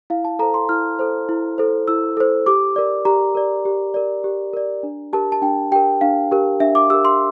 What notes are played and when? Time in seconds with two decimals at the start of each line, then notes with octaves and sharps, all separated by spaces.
0.10 E4 F5
0.25 A5
0.39 A4 C5 A#5
0.54 C6
0.69 E4 F6
0.99 A4 C5
1.29 E4
1.58 A4 C5
1.88 E4 E6
2.17 A4 C5
2.46 G4 D6
2.76 A#4 D5
3.05 G4 A#5
3.35 A#4 D5
3.65 G4
3.94 A#4 D5
4.24 G4
4.53 A#4 D5
4.83 D4
5.13 G4 A#4 A5
5.32 A5
5.42 D4 G5
5.71 G4 A#4 G5
6.01 D4 F5
6.31 G4 A#4
6.60 D4 E5
6.75 D6
6.90 G4 A#4 E6
7.05 C6